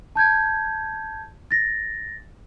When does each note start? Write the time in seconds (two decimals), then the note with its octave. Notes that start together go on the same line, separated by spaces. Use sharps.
0.15 A5 G6 G#6
1.51 A6 A#6